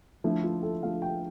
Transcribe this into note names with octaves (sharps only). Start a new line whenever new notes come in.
D3 F3 A3 E4
F4
A4
D3 F3 A3 F5
G5